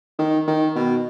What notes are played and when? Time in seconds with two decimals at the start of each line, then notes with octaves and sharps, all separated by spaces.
0.19 D#3
0.47 D#3
0.75 B2